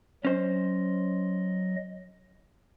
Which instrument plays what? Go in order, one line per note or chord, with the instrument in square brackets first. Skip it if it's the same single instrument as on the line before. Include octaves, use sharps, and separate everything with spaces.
[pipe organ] F#3 D#5 [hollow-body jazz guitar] C#4 C5